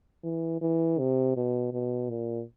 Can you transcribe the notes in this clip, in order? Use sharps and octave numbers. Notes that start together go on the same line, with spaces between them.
E3
E3
C3
B2
B2
A#2